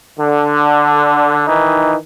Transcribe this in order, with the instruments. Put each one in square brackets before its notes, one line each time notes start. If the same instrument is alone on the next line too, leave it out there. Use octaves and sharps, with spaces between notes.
[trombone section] D3
D#3 E3 D#4